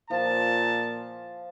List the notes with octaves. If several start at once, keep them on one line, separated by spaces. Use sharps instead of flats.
A#2 F3 A5